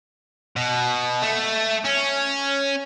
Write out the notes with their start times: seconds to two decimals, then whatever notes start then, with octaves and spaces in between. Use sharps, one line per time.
0.56 B2
1.22 A3
1.84 C#4